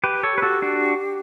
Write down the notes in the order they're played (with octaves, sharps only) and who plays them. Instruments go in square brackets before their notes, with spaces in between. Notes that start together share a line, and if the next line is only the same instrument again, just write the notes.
[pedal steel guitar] G4 B4
A4 C#5
[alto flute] G4 [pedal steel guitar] B4
[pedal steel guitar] F#4 A4
D4 F#4